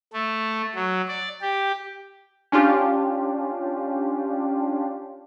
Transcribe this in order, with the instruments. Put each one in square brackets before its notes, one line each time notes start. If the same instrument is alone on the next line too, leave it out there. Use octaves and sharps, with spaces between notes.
[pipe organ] A3
F#3
D5
G4
[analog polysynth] C#4 D4 F4 G4